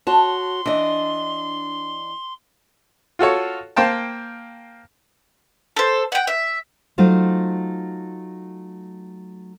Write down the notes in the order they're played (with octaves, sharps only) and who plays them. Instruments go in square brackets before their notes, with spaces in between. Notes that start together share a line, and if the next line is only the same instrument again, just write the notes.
[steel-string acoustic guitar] F#4 C#5 [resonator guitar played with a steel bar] A5 [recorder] C6
[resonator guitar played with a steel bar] E3 [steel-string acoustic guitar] D4 D#5
[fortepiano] F4 F#4 A4 C#5
A#3 C5 F5 G5 A5
[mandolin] A4 C5
F#5 G5
E5
[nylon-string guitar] F#3 A3 D#4 F4 C5